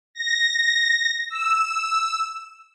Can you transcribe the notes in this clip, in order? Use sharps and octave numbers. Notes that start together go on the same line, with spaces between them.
A#6
E6